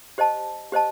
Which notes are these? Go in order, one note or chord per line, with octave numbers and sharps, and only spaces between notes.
G4 C5 D#5 A5
G4 C5 D#5 A5